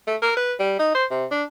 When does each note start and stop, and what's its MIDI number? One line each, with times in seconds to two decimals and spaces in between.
0.07 0.16 57
0.22 0.35 70
0.37 0.54 71
0.59 0.75 55
0.79 0.91 63
0.95 1.05 72
1.10 1.25 48
1.31 1.44 62